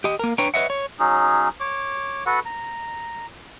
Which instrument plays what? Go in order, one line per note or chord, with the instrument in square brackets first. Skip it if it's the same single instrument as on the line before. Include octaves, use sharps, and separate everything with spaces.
[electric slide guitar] G4 D#5
A#3 A#4
D4 B4 C#5 G5 A#5
B4 C#5 D#5 E5 F#5
C#5
[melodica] F#3 C#4 D#4 G#4
C#5 D6
F#4 A4 B4 F#5
A#5